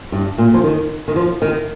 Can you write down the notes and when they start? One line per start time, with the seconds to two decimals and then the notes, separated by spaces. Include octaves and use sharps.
0.12 G2
0.38 A#2
0.54 F3
0.64 D#3
1.08 D#3
1.16 F3
1.42 D#3